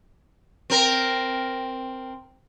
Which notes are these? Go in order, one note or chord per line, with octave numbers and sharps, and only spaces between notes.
C4 A#4